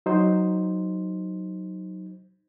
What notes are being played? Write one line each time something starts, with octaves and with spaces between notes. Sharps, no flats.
F#3 D#4 C5